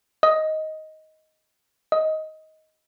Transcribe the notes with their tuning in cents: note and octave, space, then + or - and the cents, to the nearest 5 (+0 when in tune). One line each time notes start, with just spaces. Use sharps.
D#5 +10
D#5 +15